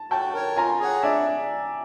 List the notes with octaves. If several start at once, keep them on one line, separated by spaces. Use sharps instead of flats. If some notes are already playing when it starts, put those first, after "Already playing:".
Already playing: A5
F#4 G5 A5
A#4 C#5
F4 G#5 A#5
G#4 C#5 F#5
D4 D5 E5